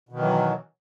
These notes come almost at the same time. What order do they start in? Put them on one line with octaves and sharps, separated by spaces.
B2 D#3 E3 F#3